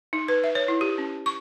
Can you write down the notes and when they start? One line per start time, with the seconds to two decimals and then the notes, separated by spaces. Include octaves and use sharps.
0.13 D#4
0.28 B4
0.44 E5
0.55 C#5
0.68 E4
0.81 G4
0.98 C#4
1.26 C#6